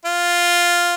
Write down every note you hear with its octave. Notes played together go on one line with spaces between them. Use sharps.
F4